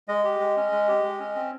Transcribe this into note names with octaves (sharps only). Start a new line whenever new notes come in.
G#3 D#5
G4
G#3
C#4
G#3
G4
G#3
C#4
C4